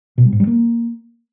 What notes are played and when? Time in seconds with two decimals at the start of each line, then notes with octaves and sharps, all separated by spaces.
0.18 B2
0.25 G3
0.32 G#2
0.40 G3
0.47 A#3